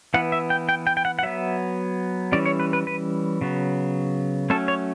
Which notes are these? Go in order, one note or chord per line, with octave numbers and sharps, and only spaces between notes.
E3 B3 F#5
E5
G5
G5
G5
G5
F#5
F#5
F#3 B3 E5
E3 G3 C#4 D5
C#5
B4
B4
B4
C#3 F#3 B3
F#3 A3 C#4 A4
C#5